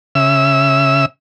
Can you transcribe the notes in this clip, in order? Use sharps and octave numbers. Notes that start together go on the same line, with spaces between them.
C#3 E5 E6